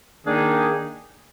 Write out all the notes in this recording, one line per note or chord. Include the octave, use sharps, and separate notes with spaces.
D#3 A#3 D4 G#4